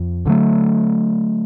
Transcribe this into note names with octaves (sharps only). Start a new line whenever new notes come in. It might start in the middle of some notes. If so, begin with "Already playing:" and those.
Already playing: F2 F3
D2 D3 F#3 A3